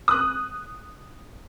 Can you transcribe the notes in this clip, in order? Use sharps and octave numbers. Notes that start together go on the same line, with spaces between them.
D#6 F#6